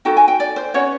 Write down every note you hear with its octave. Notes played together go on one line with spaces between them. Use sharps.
D#4 F#4 A4 G5
G#5
G5
D5
C5
C#4 F#4 B4 C#5